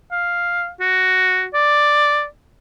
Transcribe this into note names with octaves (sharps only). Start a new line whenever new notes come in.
F5
F#4
D5